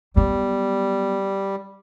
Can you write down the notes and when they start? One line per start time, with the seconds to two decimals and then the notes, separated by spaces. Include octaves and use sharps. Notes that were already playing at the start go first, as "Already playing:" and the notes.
0.16 F#3 G3 B3